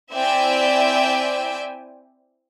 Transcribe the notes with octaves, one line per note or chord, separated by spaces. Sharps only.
C4 E4 D5 E5 G5 G#5